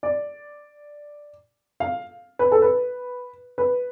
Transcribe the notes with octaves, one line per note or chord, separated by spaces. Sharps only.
D5
F5
B4
A4
B4
B4